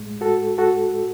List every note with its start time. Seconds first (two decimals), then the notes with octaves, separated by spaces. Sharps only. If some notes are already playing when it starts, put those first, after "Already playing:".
Already playing: A2 G#3
0.21 F#4 A4
0.58 F#4 A4